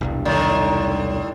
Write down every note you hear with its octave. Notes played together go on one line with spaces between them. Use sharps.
E1 C2 G2
A2 D3 D#3